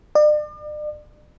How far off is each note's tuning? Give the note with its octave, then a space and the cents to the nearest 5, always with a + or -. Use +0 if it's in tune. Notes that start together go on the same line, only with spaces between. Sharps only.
D5 +40